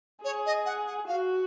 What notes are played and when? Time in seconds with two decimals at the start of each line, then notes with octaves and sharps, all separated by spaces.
0.25 G#4 C#5
0.46 D#5
0.66 F#5
0.87 F#5
1.08 F#4 F5